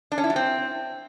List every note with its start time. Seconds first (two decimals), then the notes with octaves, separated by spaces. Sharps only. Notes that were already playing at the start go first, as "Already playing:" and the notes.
0.12 D4
0.18 C#4
0.24 E4
0.30 F#3
0.36 C4